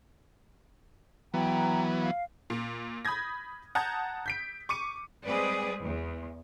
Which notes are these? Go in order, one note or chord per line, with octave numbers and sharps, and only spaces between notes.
E3 F#3 B3 G5 A#5
F5
A#2
B5 D#6 G6 G#6 A#6
F#5 A5 A#5 D#6 G6 G#6
G6 B6 D7
C#6 D6 C#7 D#7
G3 G#3 C4 G#4 B4 D5
E2